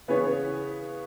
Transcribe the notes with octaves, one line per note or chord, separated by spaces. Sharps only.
C#3 E3 B3 G#4 C#5